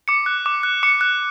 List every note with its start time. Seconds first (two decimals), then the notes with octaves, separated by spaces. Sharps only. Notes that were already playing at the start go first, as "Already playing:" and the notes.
0.08 D6 C#7
0.26 F#6
0.46 D6
0.63 F#6
0.83 D6 C#7
1.01 F#6